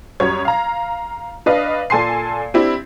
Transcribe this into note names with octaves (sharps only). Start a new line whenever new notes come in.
F#2 G3 F#4 C#5 G#6
F5 A#5
D4 B4 D#5 F5
A#2 A4 G#5 A5 C6 C7
C4 D4 E4 G4